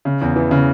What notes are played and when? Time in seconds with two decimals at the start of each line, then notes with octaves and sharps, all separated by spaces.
0.05 C#3
0.21 E2
0.36 E3
0.51 C#3